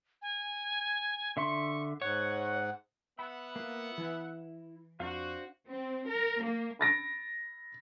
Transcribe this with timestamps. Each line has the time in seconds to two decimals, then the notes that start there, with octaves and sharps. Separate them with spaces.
0.22 G#5
1.37 D3 E5 C6 C#6
2.02 G#2 C#5 F#5
3.19 B3 E5 F#5 B5
3.56 A#3 F4
3.98 E3 E4
5.00 F2 D4 F#4 C5 F5
5.66 C4
6.07 A#4
6.42 A#3
6.79 B5 A6 A#6 D7